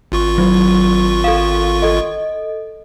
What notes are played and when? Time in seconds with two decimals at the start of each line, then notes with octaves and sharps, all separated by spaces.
0.12 G#1 F4 C#6
0.38 F#3
1.24 A4 F5
1.82 A4 D#5